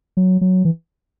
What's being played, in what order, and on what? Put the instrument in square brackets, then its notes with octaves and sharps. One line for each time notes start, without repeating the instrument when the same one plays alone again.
[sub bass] F#3
F#3
E3